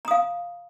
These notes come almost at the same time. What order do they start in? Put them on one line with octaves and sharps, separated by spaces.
A#5 D#6 F5